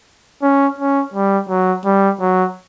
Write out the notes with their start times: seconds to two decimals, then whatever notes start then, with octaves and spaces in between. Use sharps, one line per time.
0.42 C#4
0.78 C#4
1.13 G3
1.49 F#3
1.85 G3
2.20 F#3